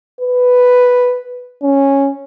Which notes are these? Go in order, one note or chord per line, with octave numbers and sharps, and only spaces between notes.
B4
C#4